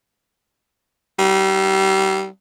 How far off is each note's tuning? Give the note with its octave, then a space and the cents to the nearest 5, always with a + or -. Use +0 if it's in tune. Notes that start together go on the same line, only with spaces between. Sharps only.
G3 -30